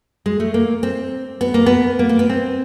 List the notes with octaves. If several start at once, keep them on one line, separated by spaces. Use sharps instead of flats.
G#3
A3
A#3
C4
B3
A#3
B3
A#3
A#3
B3
C4